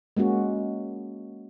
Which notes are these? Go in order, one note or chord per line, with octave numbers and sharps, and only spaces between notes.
G#3 A#3 C#4 F#4